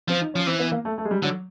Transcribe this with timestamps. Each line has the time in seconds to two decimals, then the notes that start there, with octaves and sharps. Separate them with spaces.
0.08 F3 C4
0.21 D#4
0.34 F3 C#4
0.47 E3 C4
0.60 B3
0.72 A#3
0.85 A3
0.98 A3
1.05 G#3
1.11 G3
1.23 D3 F#3